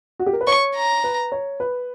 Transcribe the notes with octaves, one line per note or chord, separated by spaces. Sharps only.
F#4
G4
A#4
B4
C#5 C#6
A#5
B4
C#5
B4